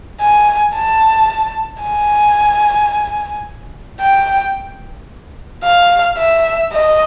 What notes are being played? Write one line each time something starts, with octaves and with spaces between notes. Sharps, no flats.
G#5
A5
G#5
G5
F5
E5
D#5